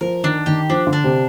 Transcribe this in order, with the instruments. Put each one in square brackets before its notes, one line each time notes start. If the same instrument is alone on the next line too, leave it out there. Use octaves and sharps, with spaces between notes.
[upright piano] F3 [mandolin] A#4
[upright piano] D#3 [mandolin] D4
[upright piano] D#3 [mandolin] G4
[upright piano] F3 [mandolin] D4
[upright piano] D3
[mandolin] D4
[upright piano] C3